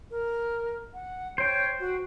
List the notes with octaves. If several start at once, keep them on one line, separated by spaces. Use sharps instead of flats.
A#4
F#5
C5 C#5 G5
F#4